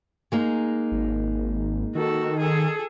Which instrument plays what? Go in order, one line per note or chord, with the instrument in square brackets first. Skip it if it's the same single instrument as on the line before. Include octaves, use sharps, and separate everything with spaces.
[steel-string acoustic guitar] G#3 A#3 D#4
[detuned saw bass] G#1
[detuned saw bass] D#3 [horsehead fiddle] F#4 A4
[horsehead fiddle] G#4 A4